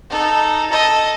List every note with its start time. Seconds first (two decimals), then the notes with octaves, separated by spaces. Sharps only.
0.10 D#4 A4
0.70 A4 D#5